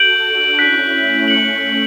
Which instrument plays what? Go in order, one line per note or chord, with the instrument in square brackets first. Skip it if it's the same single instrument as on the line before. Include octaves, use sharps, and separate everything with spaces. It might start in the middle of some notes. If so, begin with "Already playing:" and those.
Already playing: [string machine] F#4 A4 [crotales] G6 D7 F#7
[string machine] D4 F#4
[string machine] C#4 E4 [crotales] F#6 B6 D7
[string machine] A3 C#4
[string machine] A3 C#4 [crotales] F#6 C#7 F#7